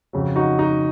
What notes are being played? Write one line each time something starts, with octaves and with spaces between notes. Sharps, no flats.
F2 C#3 F#3
D#4 F#4
D#4 F#4